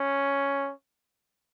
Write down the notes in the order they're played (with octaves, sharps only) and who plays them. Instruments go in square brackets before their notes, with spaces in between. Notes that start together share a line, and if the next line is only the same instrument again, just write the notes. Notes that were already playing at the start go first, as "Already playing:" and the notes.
Already playing: [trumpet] C#4